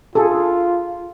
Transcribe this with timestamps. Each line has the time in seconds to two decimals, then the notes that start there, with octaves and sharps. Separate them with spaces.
0.15 F4 G#4 A4